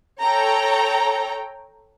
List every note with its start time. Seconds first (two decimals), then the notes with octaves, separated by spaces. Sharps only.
0.22 A4 C#5 G5 A#5